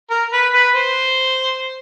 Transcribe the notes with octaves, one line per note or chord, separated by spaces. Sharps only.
A#4
B4
B4
C5